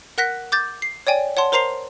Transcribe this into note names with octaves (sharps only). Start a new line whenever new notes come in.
A#4 F#5 F#6 A#6 B6
D6 G6 A6
C7
C#5 D5 G5 G#5
C#5 F#5 A5 C6
A#4 C5 A#5 C6 C7 F7